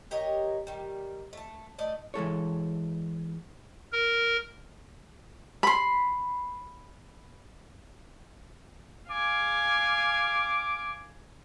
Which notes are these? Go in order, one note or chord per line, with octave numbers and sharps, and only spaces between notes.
G4 A#4 C#5 D#5
D#3 G3
A3 A5
A3 D5 D#5
E3 G#3 A4 C#5
A#4
B5 C6
F5 G#5 D6